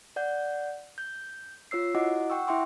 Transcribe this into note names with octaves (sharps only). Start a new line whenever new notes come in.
D5 F#5 G6
G6
F4 C#5 E6 C7
E4 F#4 D#5 F#5 D6
F#5 G5 C#6 E6
E4 E5 G5 C6 D6